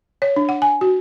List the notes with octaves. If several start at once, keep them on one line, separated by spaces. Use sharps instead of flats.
C#5
D4
F#5
G#5
F#4